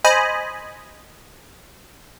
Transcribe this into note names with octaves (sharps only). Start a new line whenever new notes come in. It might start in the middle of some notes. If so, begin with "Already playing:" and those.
C5 D#5 G#5 B5